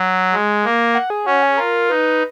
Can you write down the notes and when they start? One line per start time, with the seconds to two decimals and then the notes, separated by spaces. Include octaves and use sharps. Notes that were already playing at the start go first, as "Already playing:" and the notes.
Already playing: F#3
0.32 G#3
0.64 A#3
0.95 F#5
1.10 G#4
1.26 C#4 F#4
1.43 G#4
1.58 F4 A#4
1.90 D#4 B4